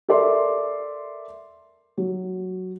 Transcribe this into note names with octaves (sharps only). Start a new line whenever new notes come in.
A4 A#4 D5 E5 C6
F#3